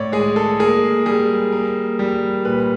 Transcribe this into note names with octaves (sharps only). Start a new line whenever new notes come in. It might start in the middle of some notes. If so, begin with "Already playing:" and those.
Already playing: A2 C#5 D5
G#3 G#4
A4
A#3 G#4
G3 G#4
A#3
G3
A#2 B4